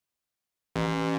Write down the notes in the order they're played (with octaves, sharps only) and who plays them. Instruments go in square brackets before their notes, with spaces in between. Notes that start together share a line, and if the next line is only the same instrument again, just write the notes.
[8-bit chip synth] A1